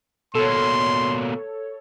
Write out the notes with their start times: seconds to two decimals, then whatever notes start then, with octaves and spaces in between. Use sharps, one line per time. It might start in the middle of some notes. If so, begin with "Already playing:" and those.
0.35 B2 A#3 A4 C#5 C6